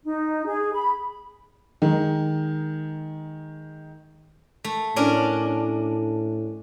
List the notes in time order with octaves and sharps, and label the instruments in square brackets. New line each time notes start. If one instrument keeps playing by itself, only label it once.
[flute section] D#4
G#4
B5
[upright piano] D#3 G#3
[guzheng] A3
[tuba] A2 [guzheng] C#4 D4 A#4